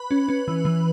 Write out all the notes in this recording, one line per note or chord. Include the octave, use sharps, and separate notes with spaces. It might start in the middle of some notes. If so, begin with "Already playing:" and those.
Already playing: B4 B5
C#4
C#4
E3
E3